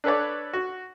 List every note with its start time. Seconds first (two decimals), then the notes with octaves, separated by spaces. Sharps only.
0.04 D4 A4 B4 C#5 D5
0.53 F#4